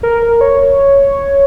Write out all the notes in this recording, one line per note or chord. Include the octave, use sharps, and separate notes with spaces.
A#4
A#4
C#5